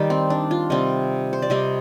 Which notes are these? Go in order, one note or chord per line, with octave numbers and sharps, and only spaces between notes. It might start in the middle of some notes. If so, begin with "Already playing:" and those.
Already playing: D#3 G3 D#4
C4
D4
F4
C3 G3 C4 D#5
C5
D5
C3 G3 C4 D#5